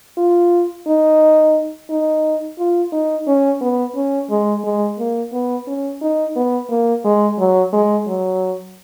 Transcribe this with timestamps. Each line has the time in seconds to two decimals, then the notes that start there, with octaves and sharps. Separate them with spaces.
0.18 F4
0.87 D#4
1.90 D#4
2.58 F4
2.93 D#4
3.27 C#4
3.61 B3
3.95 C#4
4.30 G#3
4.64 G#3
4.99 A#3
5.33 B3
5.67 C#4
6.01 D#4
6.36 B3
6.70 A#3
7.05 G#3
7.39 F#3
7.73 G#3
8.07 F#3